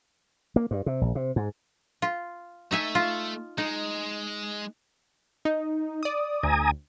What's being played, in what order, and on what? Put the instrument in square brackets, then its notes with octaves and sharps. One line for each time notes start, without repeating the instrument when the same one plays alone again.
[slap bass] A#3
G2
C3
A#1
C3
G#2
[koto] F4
[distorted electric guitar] A3 [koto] D#4 E5 G#5
[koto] F4
[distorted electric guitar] G#3 [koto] D#4
[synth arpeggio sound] D#4
D5 D#6
[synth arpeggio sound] D2 [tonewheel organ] G#5 A#5 D#6